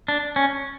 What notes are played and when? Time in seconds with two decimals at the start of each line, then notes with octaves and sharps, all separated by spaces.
0.08 D4
0.36 C#4